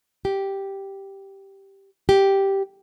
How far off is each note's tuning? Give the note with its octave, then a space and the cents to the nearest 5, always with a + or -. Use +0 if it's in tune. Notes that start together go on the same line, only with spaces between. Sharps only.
G4 -5
G4 -5